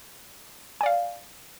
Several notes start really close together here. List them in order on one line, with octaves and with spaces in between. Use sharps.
G#5 D5 F5